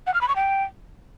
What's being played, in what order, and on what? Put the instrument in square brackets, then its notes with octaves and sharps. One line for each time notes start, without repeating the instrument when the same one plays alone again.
[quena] F#5
F6
B5
C#6
G5